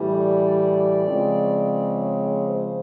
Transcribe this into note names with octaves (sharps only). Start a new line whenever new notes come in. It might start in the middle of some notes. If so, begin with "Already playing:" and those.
Already playing: A2 E3 G3
D5
C#3 F3 G#3 C4
C#5
C5